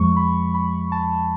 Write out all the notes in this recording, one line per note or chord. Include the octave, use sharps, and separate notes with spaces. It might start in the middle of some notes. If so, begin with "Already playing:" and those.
Already playing: F2 F3 G#3 C#6
B5
B5
A5